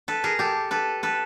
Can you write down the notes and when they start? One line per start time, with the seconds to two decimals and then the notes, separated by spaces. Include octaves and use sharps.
0.08 A4 B4
0.24 G#4 A#4
0.39 G4 A4
0.71 A4 B4
1.03 A4 B4